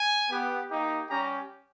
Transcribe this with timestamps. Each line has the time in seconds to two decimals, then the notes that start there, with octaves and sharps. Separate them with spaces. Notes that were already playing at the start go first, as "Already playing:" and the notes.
Already playing: G#5
0.30 B3 G4
0.70 A#3 D#4 G4
1.09 G3 C#4 G4 A#5